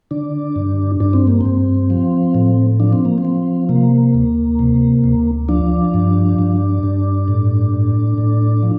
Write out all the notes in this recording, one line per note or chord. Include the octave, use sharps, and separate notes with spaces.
D3 D4
G2
G2 D4
C4
A#3
G2 C4
F3
A2
F3 D4
C4
A#3
C4
F3
C3 A#3
D2
C3
D2
F3 D4
G2
G2
G2
A2
A2
A2
F3